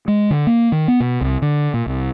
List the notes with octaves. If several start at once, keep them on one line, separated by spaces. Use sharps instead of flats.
G#3
D3
A#3
D#3
B3
B2
C2
D3
A#2
C2